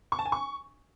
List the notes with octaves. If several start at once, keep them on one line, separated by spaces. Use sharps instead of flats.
C#6
A5
G#5
C#6